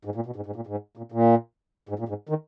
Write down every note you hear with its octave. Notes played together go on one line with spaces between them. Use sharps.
G#2
A#2
B2
G#2
G#2
A#2
G#2
A#2
A#2
G#2
A#2
G#2
D#3